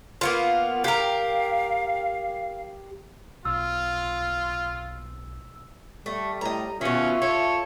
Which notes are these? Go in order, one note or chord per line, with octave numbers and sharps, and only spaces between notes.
A#3 B3 F4
G4 A#4 F5
B1 F4 E6
G3 A3
A2 D#5 A#5
B2 D#3 C#4 F4 E5
A4 C#5